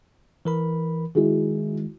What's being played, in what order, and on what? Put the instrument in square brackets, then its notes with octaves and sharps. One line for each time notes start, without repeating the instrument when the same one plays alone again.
[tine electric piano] E3 A#4 B5
[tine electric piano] D#3 G#3 [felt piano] E4 F#4 G#4